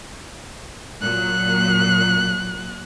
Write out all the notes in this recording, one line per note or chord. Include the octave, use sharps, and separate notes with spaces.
A#2 F#3 F#6